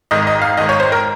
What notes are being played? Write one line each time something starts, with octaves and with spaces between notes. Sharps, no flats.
G#1 G#2 D#3 D#5
D#5
F5
G#1 G#2 D#3 D#5
C#5
C5
A#4